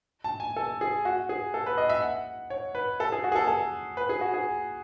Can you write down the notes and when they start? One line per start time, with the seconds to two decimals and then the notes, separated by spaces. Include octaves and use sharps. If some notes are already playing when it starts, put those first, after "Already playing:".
0.24 A5
0.40 G#5
0.56 A4
0.81 G#4
1.05 F#4
1.29 G#4
1.54 A4
1.66 B4
1.78 D#5
1.90 E5
2.02 F#5
2.50 C#5
2.75 B4
3.00 A4
3.12 G#4
3.24 F#4
3.32 G#4
3.35 A4
3.48 A4
3.97 B4
4.09 G#4
4.21 F#4
4.34 G#4